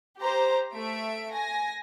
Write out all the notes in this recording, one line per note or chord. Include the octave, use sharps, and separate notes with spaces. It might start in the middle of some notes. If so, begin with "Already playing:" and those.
G4 C5 A#5
A3 E5 D7
G#5 A#6